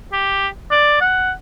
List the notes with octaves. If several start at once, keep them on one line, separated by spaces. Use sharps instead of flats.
G4
D5
F#5